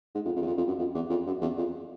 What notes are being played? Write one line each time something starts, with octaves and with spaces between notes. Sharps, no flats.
G#2
F2
F2
E2
F2
F2
F#2
F2
E2
F2
F#2
E2
F2